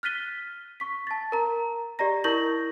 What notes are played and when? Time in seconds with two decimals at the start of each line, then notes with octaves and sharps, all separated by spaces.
0.03 F6 F#6 A6 B6 D#7 G7
0.80 C#6 B6
1.07 A5 A6
1.32 A#4 A#5
1.99 G4 D5 D#5 A#5 A#6
2.24 E4 A#4 C#6 G6 A#6 F#7